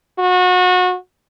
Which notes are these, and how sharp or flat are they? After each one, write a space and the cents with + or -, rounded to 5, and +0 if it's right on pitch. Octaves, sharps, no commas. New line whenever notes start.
F#4 -30